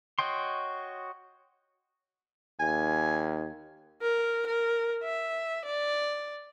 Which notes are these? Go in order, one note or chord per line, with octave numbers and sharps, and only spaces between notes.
F#4 C#5 D#5 G5 C6
D#2 G#5
A#4
A#4
E5
D5